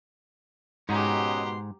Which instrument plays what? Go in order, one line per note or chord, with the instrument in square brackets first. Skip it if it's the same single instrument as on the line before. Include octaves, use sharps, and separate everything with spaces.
[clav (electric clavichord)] G#2 [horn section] B2 F#5 C6 [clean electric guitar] C#4 D#4 [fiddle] G4 A#5